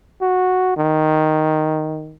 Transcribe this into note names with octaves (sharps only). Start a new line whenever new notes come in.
F#4
D#3